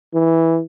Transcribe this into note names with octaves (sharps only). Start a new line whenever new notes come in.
E3